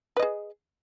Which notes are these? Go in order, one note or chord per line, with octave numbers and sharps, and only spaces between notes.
G#4 B4 D#5